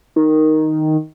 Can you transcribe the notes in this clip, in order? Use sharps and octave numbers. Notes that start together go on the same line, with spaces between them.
D#3